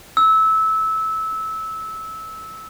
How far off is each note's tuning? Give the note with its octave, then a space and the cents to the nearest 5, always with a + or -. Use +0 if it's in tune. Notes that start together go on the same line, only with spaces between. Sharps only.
E6 -20